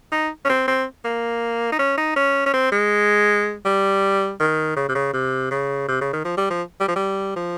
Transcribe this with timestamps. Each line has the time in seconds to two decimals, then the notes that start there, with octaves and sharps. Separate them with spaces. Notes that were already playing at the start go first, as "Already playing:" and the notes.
0.12 D#4
0.45 C#4
0.49 C4
0.68 C4
1.05 A#3
1.72 D#4
1.79 C#4
1.97 D#4
2.16 C#4
2.46 C#4
2.54 C4
2.72 G#3
3.65 G3
4.40 D#3
4.76 C#3
4.89 C3
4.95 C#3
5.13 C3
5.51 C#3
5.88 C3
6.01 C#3
6.13 D#3
6.25 F3
6.37 G3
6.50 F3
6.80 G3
6.88 F3
6.96 G3
7.36 F3